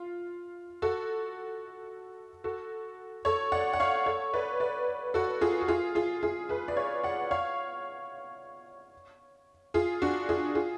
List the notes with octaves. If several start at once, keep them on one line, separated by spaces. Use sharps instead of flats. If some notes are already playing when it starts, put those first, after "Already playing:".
Already playing: F4
F#4 A4
F#4 A4
A4 C#5
D5 F#5
F#5
C#5 F5
A4 C#5
B4 D5
B4 D5
F#4 A4
F4 G#4
F#4
F4 G#4
F4 G#4
F4 G#4
G#4 B4
D5
C#5 F5
D5 F#5
C#5 F5
F4 G#4
D4 F#4
F4 G#4
F4 G#4